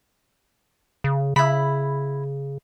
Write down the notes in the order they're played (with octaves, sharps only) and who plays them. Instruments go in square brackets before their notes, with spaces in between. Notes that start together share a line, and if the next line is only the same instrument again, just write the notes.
[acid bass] C#3
[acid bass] C#3 [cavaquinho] E4 B5